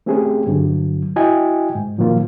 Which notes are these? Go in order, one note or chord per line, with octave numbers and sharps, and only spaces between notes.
A3 C4 C#4 G4 G#4
G2 D3 F#3
E4 F#4 D#5 G5 G#5
G#2
A#2 D#3 F3 F#3 A#3 F4